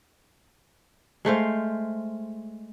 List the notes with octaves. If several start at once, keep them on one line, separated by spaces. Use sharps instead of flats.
G#3 A3 C5 F5